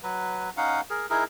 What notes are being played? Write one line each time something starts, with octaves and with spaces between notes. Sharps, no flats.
F#3 B4
C#4 D#4 F5 F#5
G#4 A#4
D#4 E4 G#4 A#4